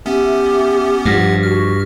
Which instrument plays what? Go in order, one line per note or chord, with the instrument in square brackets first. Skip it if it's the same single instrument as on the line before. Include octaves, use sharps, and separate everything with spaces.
[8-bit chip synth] B3 C#4 [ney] G4 [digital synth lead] E5
[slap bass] G2 [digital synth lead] F3 [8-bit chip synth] F#5 F6
[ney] F#4 [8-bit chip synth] F6